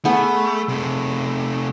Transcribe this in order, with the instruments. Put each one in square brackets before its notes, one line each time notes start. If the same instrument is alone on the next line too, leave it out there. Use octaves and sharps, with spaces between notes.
[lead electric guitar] A3 [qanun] B3 G#4
[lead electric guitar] C3 A3